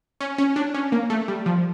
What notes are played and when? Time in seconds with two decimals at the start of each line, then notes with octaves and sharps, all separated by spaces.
0.21 C#4
0.38 C#4
0.56 D4
0.74 C#4
0.92 A#3
1.10 A3
1.28 G3
1.46 F3